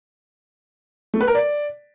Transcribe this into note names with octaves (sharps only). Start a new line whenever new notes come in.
A3
B4
A#4
D5